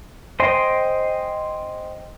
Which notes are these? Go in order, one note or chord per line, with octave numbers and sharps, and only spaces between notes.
C5 D#5 G5 G#5 C6